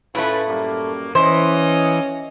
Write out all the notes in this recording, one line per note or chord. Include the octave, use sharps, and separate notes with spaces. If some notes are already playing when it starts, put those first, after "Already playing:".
A2 A3 C#4 F4 B4
F#2 G3 A#3
E3 C#4 C5 D#5